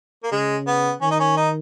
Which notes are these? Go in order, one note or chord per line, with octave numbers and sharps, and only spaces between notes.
A#3
C#3 G#3
B3
D#3 C#4
D#4
C#4
D#4